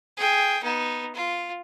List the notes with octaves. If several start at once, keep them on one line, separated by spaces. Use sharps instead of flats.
G#4 G5
B3 D#4
F4